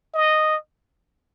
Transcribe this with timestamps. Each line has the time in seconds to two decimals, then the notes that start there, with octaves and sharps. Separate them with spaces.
0.14 D#5